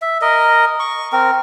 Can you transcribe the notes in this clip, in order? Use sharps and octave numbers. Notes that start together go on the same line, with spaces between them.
E5
A#4 D#5
C#6
C4 A#4